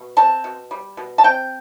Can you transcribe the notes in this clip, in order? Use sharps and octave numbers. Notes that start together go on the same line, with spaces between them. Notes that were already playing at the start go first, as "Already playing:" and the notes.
Already playing: B2
C4 A5
B2
G3
B2
A5
C4 G5